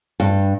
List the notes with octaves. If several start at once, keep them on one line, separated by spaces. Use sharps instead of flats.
G2